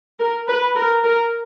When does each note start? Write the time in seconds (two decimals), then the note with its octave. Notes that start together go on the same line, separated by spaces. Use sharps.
0.20 A#4
0.48 B4
0.75 A#4
1.04 A#4